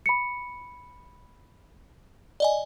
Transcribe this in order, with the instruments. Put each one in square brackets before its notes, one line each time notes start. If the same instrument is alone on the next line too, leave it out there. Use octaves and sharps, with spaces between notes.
[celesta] B5 C#7
[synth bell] D5 D#5 G#5